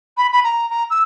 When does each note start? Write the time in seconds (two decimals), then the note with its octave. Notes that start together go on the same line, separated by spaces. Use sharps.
0.17 B5
0.32 B5
0.44 A#5
0.70 A#5
0.90 E6